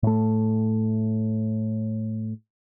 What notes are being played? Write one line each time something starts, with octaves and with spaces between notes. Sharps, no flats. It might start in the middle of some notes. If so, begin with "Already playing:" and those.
A2 A3